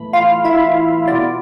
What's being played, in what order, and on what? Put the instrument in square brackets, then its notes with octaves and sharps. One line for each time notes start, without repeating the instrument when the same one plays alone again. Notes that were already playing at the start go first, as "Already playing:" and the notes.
Already playing: [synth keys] B1 A2 E3 A3 B5
F4 F5
E4 E5
B2 B3 F4 D5